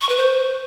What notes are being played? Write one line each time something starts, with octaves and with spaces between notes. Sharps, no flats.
C#6
B4
C5